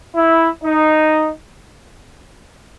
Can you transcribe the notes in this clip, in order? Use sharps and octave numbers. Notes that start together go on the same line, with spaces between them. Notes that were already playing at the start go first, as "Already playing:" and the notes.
E4
D#4